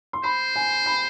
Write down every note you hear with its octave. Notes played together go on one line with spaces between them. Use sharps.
C6
C5 B5
G#5
B5